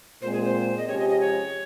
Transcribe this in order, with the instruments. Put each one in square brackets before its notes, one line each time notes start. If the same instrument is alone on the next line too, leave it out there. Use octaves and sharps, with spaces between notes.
[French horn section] A#2 G#3 C4 [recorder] C5
[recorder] G#4
C5
D#5
[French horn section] C3 F3 G#3 C#4 G4 [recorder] C#5
[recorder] D#5
D#5
C#5